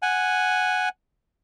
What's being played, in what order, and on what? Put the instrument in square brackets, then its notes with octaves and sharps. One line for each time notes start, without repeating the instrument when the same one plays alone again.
[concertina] F#5 G#5